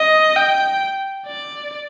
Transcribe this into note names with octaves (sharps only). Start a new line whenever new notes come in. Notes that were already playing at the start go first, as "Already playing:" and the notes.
Already playing: D#5
G5
D5